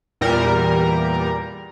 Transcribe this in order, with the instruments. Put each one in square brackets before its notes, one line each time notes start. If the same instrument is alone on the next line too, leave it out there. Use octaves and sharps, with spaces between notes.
[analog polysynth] E2 A#2 G3 A#4